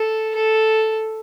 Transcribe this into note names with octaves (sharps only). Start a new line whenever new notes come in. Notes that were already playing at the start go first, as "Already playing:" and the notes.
Already playing: A4
A4